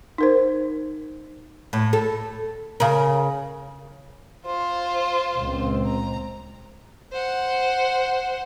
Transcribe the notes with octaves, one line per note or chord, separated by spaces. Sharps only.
D#4 A#4 C5
A2
A4
C#3 A#4
F4 C5
C#2 A#2 C4
A#5
C5 F#5